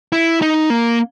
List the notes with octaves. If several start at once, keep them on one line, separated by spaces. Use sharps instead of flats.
E4
D#4
A#3